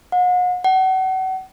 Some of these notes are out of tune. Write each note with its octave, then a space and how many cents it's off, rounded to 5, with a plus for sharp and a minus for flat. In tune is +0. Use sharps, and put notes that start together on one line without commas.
F#5 -40
F#5 +35